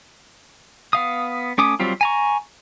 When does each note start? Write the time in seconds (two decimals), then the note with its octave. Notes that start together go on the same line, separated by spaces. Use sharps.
0.93 B3 F5 D#6
1.58 A3 C#4 D6 D#6
1.80 F#3 G3 C4 F4
2.01 G#5 A#5 C#6